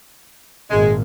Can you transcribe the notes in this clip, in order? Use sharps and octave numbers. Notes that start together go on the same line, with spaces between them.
G#1 A#2 G#3